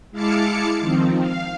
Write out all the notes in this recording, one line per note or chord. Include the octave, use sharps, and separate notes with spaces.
G#3 E4 F5 A5 D6 C#7
D#3 F3 C4
F5